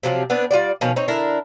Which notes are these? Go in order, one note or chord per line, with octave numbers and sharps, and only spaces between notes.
C3 F3 F#3 C4
B3 C4 D4 B4
G3 F4 F#4 D5
B2 D#3 F3 C#4
C4 D#4 C#5
D3 D4 E4 A#4